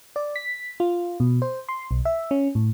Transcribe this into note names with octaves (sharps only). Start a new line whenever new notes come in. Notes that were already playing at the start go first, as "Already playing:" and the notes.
D5
B6
F4
B2
C5
C6
B1
E5
C#4
A2